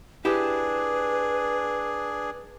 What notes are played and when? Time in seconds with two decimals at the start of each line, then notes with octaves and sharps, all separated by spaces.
0.25 D4 E4 G4 G#4 B4